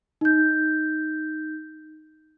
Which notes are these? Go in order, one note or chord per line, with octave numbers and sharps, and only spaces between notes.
D#4 G6